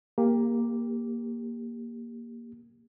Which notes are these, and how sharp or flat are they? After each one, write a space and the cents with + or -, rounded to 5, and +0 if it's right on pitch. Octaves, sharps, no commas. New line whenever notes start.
A#3 +5 G4 +20